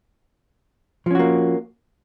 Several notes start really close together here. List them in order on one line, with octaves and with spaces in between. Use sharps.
F3 C#4 F#4 A#3